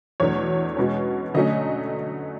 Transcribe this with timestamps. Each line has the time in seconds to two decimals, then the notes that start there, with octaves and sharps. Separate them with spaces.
0.20 E2 B2 F#3 A3 D4 C#5
0.77 B2 G#3 C#4
1.34 D3 F#3 A3 C#4 D#5